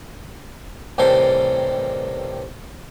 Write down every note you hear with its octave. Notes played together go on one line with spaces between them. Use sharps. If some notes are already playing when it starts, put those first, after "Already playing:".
A1 G2 C3 D#3 A4 C6